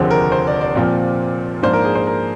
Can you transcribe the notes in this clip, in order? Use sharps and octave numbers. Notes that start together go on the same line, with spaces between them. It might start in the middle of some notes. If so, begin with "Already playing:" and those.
Already playing: F1 D#2 D3 F3 C4 G#4
A#4
C5
D5
D5
A#2 F3 C4 F4
G#2 F3 A#3 D4 C5
A#4
G#4
C5
A#4